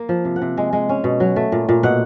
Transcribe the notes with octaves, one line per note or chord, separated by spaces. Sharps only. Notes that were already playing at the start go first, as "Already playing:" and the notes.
Already playing: A#3
F3
C3
F#5
C3
G#3
G#3
C#4
B2
F#3
A3
A#2
A#2
B2 F#5